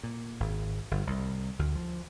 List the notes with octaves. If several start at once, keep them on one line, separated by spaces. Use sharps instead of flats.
A#2
G#1
G1
C2
D2
F3